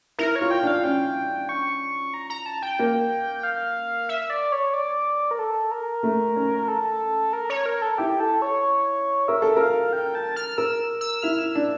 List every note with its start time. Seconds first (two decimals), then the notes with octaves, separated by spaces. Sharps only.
0.18 E4 A#4
0.36 C#5
0.41 F4
0.51 G5
0.63 D4 F5
0.84 C#4 G5
1.49 C#6
2.14 A#5
2.30 A#5
2.46 A5
2.62 G5
2.79 A#3
3.43 F5
4.09 E5
4.30 D5
4.52 C#5
4.74 D5
5.31 A#4
5.39 A4
5.71 A#4
6.03 A3
6.36 C#4
6.68 A4
7.33 A#4
7.50 C#5
7.66 A#4
7.82 A4
7.98 E4 G4
8.20 A4
8.42 C#5
9.28 A#4 E5
9.42 A4
9.56 A#4 F5
9.93 G5
10.15 A5
10.36 F6
10.58 A#4 E6
11.01 E6
11.22 E4 F6
11.39 E6
11.55 D4